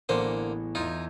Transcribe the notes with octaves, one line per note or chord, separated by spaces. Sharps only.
A1 D3 A#3 B3 G#4 C5
E2 D#4 F4 G6 G#6